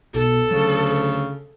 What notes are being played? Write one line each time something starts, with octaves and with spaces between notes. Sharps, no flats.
B1 B2 A4
D2 C#3 F#3